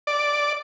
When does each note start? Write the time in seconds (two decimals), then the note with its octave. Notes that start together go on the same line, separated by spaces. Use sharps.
0.07 D5